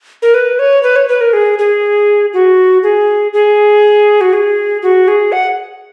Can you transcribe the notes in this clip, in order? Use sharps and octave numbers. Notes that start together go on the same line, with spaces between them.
A#4
B4
C#5
B4
C#5
B4
A#4
G#4
G#4
F#4
G#4
G#4
F#4
G#4
F#4
G#4
F#5